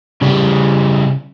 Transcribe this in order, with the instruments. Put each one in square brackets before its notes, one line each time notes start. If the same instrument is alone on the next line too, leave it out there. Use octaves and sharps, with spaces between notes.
[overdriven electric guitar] C#3 G3